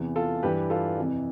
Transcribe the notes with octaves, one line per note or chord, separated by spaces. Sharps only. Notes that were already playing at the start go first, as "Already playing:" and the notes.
Already playing: E2 C3 E3
F4 A4
G2 E3 G4 B4
F4 A4
F2 C3 E3